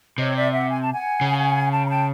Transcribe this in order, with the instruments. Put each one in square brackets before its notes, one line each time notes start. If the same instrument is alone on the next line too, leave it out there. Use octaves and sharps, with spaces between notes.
[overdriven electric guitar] C3 [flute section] C#5 D#5
[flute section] D5 E5
E5 F#5
G#5
A5
F#5 G#5
[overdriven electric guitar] C#3
[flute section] G5 A5
A#5
G5 A5